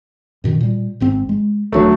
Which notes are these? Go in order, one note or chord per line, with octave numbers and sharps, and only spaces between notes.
F#2 B2 D#3
A#2 G3
G#1 G#2 C4
G#3
D#1 D2 F#3 A3 D4